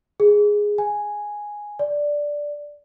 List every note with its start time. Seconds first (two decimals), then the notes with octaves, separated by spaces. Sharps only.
0.20 G#4
0.78 G#5
1.79 D5